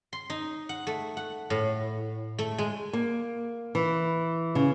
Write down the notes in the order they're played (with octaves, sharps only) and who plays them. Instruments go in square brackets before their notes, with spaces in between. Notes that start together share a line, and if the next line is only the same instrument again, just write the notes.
[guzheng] C6
D#4
F#5
A3
F#5
A2
A3
G#3
[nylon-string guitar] A#3
E3
C#3